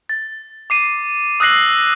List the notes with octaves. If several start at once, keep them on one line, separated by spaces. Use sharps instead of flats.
A6
D6 C7 D#7
D#6 E6 F#6 A#6 C7 F#7